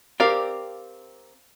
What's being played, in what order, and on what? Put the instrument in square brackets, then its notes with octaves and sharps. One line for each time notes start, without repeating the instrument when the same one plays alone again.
[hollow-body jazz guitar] C4 G4 A#4 [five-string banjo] D5 F5